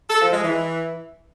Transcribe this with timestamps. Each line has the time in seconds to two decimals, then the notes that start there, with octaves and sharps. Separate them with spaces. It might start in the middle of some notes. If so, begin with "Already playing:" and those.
0.10 A4
0.21 F3
0.33 G#3
0.44 E3